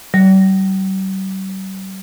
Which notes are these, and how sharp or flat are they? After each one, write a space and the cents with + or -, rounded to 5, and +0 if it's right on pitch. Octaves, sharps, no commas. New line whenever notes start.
G3 -45